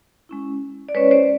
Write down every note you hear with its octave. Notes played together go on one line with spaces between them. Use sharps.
G#3 C#4 E4
D5
G#3 C#4 E4 B4 C#5
C5 D5